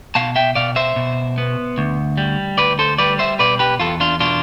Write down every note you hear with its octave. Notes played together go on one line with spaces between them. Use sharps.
B2 F5 A5
E5 G5
B2 D5 F5
C5 E5
B2
B3
D2
G3
D2 B4 D5
A4 C5
G3 B4 D5
C5 E5
B2 B4 D5
G4 B4
E2 F4 A4
D4 F4
B2 D4 F4